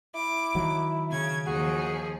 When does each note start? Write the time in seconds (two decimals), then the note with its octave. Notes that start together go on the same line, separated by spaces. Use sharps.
0.15 E4 D6
0.55 D#3 F#3
1.10 C#3 G#6
1.47 D#2 F3 F#4 G#4